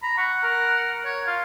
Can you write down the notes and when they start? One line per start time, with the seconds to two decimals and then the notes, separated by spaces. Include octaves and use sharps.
0.02 A#5 B5
0.17 F#5 C#6
0.43 A#4
1.05 C#5
1.27 F4 F5